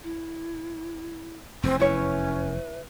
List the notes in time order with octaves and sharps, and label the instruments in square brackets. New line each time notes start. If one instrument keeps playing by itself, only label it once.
[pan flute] E4
[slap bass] F1 E2 [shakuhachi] C4
[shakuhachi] C#4 [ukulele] E4 C#5 [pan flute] B4